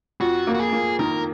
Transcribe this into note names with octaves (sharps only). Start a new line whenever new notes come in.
F2 F#4
A#3
F#4
G#4
A#3
D#3 A#4